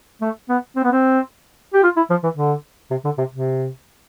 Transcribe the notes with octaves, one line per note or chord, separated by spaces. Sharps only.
A3
B3
C4
B3
C4
G4
F4
E4
F3
E3
D3
C3
D3
C3
C3